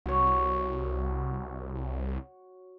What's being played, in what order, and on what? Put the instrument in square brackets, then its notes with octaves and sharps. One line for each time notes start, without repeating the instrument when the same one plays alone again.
[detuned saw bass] C2 [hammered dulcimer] F#4 C#5